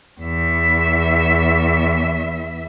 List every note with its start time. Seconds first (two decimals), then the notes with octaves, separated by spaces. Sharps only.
0.21 E2 E5